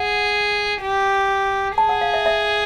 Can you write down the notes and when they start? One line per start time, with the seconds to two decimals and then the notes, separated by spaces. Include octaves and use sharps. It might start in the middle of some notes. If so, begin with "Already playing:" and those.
Already playing: G#4 F#5
0.82 G4
1.78 G#4 A5
1.89 F#5
2.01 F5
2.14 E5
2.26 E5